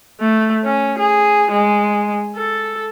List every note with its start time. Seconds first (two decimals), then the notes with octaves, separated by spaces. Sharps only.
0.20 A3
0.65 C#4
0.99 G#4
1.51 G#3
2.36 A4